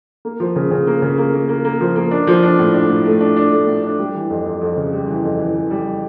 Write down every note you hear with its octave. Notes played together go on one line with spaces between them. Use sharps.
A#3
F3
C#3
C#3
A#3
C#3
A#3
A#3
A#3
A#3
F3
A#3
D4
F3
D4
A2
D4
A2
A3
D4
D4
A3
A2
D4
G3
E3
F2
F2
F2
C#3
G3
E3
F2
E3
E3
G3